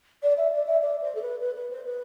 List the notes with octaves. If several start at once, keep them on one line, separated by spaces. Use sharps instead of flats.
D5
E5
D5
E5
D5
C5
A4
B4
B4
B4
C5
B4